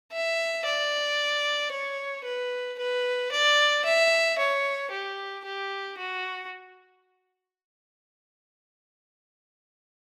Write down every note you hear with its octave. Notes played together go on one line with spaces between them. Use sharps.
E5
D5
C#5
B4
B4
D5
E5
C#5
G4
G4
F#4